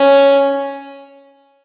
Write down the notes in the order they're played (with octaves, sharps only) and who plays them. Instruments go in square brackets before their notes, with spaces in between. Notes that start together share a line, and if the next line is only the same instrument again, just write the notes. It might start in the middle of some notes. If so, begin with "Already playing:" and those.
Already playing: [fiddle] C#4